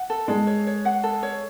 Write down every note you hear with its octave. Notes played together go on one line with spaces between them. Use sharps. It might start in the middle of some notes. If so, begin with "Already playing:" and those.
Already playing: F#5
A4
G#3 A4
C#5
C#5
F#5
A4
C#5